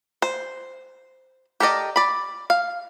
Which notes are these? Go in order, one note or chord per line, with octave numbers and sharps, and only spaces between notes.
C5
G4 A4 A#4 D5 D#5
D5 B5
F5